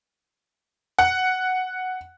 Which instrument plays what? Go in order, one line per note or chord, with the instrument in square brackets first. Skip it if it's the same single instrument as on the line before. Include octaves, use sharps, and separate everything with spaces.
[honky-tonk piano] F#5